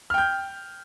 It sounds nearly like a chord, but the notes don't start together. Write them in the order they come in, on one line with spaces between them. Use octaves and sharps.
F6 G5 G6